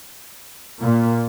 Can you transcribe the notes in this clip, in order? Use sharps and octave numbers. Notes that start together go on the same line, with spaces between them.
A#2